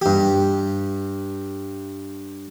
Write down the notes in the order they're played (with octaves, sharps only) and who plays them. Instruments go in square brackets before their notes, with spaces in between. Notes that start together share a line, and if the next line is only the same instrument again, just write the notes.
[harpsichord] G2 G4